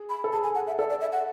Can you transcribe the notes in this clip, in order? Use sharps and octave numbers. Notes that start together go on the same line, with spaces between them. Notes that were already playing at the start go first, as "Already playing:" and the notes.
Already playing: G#4
B5
A4
G#4 A5
G#5
F#5
E5
A4 D5
D5
E5
F#5